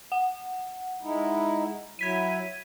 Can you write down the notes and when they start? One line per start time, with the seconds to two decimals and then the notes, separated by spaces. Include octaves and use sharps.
0.12 F#5
1.03 G#3 D#4 E4
1.99 F#3 E4 G#6 B6 D#7